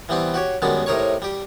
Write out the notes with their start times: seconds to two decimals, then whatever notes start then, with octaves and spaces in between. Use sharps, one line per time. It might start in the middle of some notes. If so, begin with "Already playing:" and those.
0.09 E3 G3 B3 C4
0.34 F#4 G4 C#5
0.62 F#2 D#3 G3 G#3 B3 A5
0.86 A2 C3 D#4 A#4 C#5 C#6
1.22 G3 G4